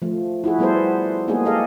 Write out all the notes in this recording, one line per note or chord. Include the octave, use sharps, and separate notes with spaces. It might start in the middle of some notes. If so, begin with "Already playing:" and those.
F3 A3
E4 F#4 G#4
G3 B3 E4 A4 B4 C5
G#3 A#3 B3 D#4 F#4 G#4
G4 A4 D#5 F5